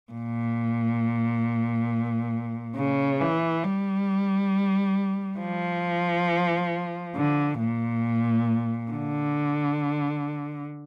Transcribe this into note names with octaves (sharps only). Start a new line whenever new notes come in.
A#2
C#3
E3
G3
F3
D3
A#2
D3